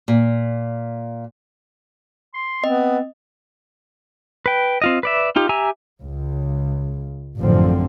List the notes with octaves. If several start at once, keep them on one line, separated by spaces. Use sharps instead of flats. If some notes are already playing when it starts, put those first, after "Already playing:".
A#2
C6
B3 C4 D#5
B4 G5
C4 F4 D#5
B4 D5 E5
D#4 F4 G4
G4 E5 G#5 A#5 E6
C#2
A1 F#2 D3 F3 C4